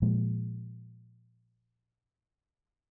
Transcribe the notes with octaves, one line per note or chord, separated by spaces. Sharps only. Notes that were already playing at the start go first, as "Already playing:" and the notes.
A#2 F3 G#3